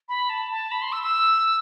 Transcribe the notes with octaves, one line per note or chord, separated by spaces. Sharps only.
B5
A5
A5
B5
C6
E6
E6